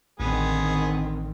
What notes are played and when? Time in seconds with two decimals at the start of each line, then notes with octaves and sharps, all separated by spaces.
0.20 A1 D3 D#3 B3 C4 G#4